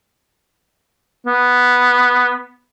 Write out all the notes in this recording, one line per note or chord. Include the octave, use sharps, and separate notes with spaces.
B3